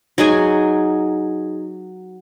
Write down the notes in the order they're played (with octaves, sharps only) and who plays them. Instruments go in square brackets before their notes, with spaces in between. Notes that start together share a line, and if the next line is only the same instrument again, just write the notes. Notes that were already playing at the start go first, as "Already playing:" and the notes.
[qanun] F#3 D#4 G#4 G#5